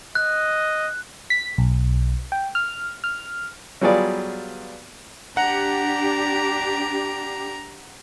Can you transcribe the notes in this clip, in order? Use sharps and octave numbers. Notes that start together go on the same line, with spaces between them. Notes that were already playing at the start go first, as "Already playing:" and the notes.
D#5 F#6
B6
B1
G5
F6
F6
F#3 G3 B3 F4 G#4 D5
D4 G4 F#5 A#5